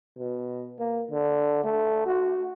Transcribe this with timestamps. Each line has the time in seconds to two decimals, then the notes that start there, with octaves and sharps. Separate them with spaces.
0.18 B2
0.79 A#3
1.11 D3
1.64 A3
2.06 F#4